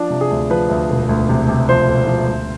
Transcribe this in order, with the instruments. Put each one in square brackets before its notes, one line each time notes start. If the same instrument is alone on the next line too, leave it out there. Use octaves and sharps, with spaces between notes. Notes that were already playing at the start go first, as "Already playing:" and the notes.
Already playing: [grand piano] F3 D4
C3
G#4
D2
F3 B4
D2
E1
D2
C3
C3
F3 C5
E1
F3
D2